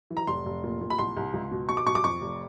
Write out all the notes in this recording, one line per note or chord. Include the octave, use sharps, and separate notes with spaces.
E3
A#5
F1 C6
F1
A#2
A#2
B5
C2 C6
C2
C#2
B2
B2 C#6
D6
B2 C#6
D6
F2 C#6
F1